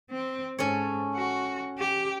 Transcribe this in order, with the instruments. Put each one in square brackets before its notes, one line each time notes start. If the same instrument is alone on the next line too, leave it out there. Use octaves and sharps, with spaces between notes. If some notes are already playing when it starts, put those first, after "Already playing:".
[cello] C4
[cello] G#2 [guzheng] C#4 A4 C#5
[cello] F#4
G4